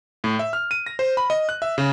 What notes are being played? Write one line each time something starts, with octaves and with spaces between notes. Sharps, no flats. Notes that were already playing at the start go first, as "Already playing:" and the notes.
A2
E5
F6
D#7
A#6
C5
B5
D#5
F#6
E5
C#3